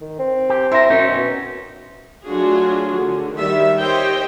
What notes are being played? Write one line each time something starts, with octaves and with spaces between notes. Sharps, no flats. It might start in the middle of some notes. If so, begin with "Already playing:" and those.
D#3
C4
G4
E4 A#4 E5 C6
F#2 C#4 D#4
B2
F#3 A3 D4 F4 F#4 G#4
D3
D#3 G3 E5
G4 C5 C#5 D#5 G5